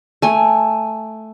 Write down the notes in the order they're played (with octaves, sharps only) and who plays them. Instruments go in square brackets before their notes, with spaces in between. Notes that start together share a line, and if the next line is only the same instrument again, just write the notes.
[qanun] A3 G#5